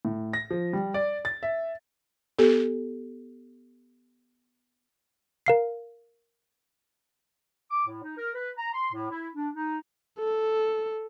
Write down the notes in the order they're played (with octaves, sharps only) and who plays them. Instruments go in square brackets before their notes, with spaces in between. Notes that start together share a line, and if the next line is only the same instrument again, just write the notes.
[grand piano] A2
A#6
F3
G3
D5
A6
E5
[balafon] B3 G4 A4
[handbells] A#4 F5 C7
[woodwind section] D6
A2
D#4
A#4
B4
A#5
C6
A2
E4
D4
D#4
[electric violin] A4